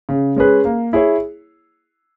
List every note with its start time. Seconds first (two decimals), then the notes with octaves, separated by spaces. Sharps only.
0.09 C#3
0.36 G#3 C#4 G#4 B4
0.65 A#3
0.93 E4 G#4 C#5